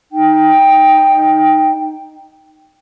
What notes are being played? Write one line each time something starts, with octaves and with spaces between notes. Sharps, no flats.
D#4 G5